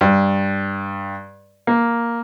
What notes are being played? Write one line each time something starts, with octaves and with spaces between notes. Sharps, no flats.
G2
A#3